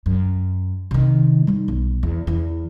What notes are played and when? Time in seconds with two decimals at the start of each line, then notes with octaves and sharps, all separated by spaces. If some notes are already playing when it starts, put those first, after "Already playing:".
0.06 F#2
0.91 C3 D#3
1.47 G3 D#4
1.68 B1
2.03 E2
2.27 E2 E3